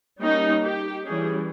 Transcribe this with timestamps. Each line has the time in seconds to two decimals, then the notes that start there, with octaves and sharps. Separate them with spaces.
0.20 G3 A#3 C#4 D#4
0.63 G4
1.05 E3 G3 C#4 G#4